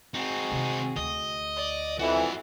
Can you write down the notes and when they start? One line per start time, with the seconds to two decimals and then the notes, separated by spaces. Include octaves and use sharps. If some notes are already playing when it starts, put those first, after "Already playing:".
0.14 C4 D#4 F#4 G#4
0.51 C3 D#3
0.97 D2 D#5
1.56 D5
1.99 F2 E3 F#4 E5